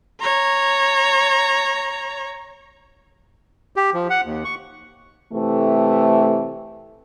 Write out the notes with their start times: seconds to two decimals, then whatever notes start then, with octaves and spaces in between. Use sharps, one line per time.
0.21 C#5 A#5
3.76 G4
3.94 F3
4.10 F#5
4.25 D#2
4.45 C#6
5.32 C3 E3 A3